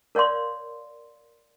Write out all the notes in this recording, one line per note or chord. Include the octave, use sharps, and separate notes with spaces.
A#4 C#5 D5 F5 C6